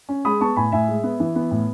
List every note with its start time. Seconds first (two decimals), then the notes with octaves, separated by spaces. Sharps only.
0.09 C#4
0.25 G#3 B5 D#6
0.41 B3 A5 C#6
0.56 A2 G#5 B5
0.72 A2 E5 G#5
0.88 G#3
1.03 B3
1.20 E3
1.35 B3
1.51 A2